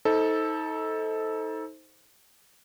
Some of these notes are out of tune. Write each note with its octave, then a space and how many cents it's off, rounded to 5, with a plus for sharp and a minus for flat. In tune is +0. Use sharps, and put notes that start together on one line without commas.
D#4 +35 A4 -5 C5 +0